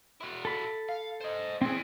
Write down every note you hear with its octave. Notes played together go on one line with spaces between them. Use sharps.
E4 F#4
A4 B5
F5
C5 D#5
E2 E3 C4 G#4